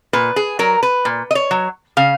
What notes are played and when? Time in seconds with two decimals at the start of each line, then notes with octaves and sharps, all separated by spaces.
0.13 A#2 B4
0.36 G#4
0.59 F#3 A#4
0.83 B4
1.05 A#2
1.31 D#5
1.35 C#5
1.51 F#3
1.97 C#3 F5